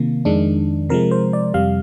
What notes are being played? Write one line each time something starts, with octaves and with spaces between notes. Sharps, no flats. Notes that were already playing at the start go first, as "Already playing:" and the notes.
Already playing: C3 D#3 A#3
F2 D#3 G#3 D4
C3 F3 G#3 A#4
C5
D5
F2 C3 G3 F5